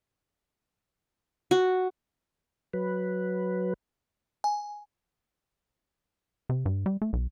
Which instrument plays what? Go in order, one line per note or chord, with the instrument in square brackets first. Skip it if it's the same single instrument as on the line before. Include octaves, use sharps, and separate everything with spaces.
[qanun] F#4
[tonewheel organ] F#3 B4
[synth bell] G#5
[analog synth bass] C3
G2
G3
A3
B1